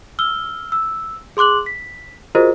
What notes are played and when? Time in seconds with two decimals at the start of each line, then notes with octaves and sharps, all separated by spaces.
0.19 E6 F6 G7
0.72 E6
1.37 G#4 C6 D6 F#6 F#7
1.66 B6
2.35 F4 F#4 G#4 A#4 C5 D#5